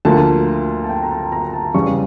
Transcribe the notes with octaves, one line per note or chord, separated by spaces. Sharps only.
D2 D3 F3 A#3 A5
A5
G5
A#5
A5
A#5
A5
E2 C#3 G3 C#6